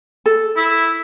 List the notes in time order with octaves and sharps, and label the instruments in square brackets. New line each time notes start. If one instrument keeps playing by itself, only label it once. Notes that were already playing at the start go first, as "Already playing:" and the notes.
[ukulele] A4
[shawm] E4